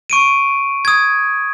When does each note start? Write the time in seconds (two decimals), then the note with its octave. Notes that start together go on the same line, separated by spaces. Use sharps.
0.10 C#6 D7 D#7
0.85 D#6 G#6